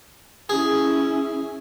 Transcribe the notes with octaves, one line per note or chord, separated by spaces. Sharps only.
C#4 E4 G#4